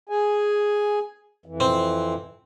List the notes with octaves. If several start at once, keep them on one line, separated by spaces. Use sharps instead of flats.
G#4 G#5
F2 E3
C4